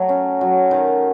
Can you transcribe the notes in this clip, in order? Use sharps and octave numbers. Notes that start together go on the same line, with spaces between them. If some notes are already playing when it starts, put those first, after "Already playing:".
Already playing: F#3 A3
C#4
F#3
D#3